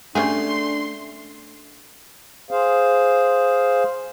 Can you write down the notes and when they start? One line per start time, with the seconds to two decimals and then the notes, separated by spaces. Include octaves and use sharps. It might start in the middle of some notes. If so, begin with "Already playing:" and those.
0.15 A3 C#4 D4 G4 G#4 C6
2.51 G#4 C5 F5